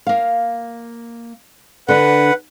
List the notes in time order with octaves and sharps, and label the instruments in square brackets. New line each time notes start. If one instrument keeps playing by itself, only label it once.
[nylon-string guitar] A#3 F5
[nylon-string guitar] D3 D4 [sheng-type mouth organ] B4 F#5